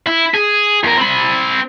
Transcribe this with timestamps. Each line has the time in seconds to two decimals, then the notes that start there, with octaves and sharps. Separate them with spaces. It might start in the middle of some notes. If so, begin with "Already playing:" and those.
0.07 E4
0.34 G#4
0.84 E2 A#4
0.97 C4 B5